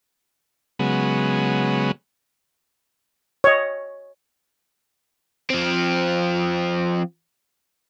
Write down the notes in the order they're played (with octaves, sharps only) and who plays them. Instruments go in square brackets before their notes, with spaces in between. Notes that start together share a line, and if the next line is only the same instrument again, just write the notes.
[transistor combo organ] C#3 F#3 G#3 B3
[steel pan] C#5 D#5
[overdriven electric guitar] F3 C4